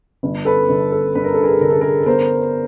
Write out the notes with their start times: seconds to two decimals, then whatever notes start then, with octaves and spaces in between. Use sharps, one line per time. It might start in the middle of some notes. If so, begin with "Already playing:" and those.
0.23 G1
0.45 A4 B4
0.69 G1
0.92 A4
1.15 G2 B4
1.24 A#4
1.34 A4
1.43 G#4 A#4
1.61 D3 A#4
1.70 A4
1.81 G#4 A#4
2.06 B3 A#4 C5